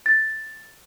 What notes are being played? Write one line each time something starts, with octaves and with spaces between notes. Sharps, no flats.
A6